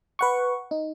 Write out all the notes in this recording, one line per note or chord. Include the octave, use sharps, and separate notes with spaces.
B4 F#5 C#6
D#4